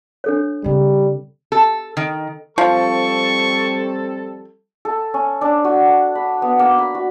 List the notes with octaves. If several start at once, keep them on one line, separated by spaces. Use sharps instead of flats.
D4 A4 C#5
C#3 G3 C4
A4
D#3
F3 G3 C4 A4 C#6
A4
C#4
D4
F#4
B5
B3
A#3
B5
F#4